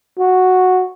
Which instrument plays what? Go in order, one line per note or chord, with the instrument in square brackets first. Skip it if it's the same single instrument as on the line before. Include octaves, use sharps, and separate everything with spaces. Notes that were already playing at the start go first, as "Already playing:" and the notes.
[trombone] F#4